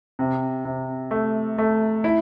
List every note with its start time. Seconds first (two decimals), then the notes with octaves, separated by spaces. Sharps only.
0.19 C3
0.65 C3
1.11 A3
1.58 A3
2.04 E4